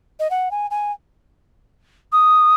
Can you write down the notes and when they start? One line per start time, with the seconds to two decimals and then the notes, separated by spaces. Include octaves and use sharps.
0.19 D#5
0.30 F#5
0.51 G#5
0.70 G#5
2.12 D#6